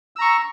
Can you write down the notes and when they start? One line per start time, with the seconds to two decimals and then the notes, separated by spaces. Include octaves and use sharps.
0.16 E6
0.19 A#5
0.21 C#6